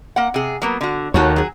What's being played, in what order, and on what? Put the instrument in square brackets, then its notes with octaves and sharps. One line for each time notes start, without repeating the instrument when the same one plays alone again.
[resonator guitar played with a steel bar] A#3 F#5
C3 G#4
F#3 A#3 B3
D3 F#4
[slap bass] D#2 [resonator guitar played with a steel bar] A3 F#4 C#5
[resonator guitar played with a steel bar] F#3 G#4